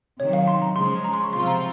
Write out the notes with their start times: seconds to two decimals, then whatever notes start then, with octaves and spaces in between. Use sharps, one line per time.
0.20 C3 D#3 F#3 C#5
0.33 F5
0.48 C6
0.62 A#5
0.76 C#3 F3 G#3 C6
0.86 C6
1.04 A#5
1.14 C6
1.24 C#6
1.33 C3 F3 C4 F4 C6
1.47 A#5